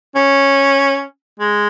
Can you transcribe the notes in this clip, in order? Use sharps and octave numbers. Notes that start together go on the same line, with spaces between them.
C#4
G#3